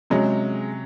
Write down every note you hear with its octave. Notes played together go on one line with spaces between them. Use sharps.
C3 F#3 G#3 C#4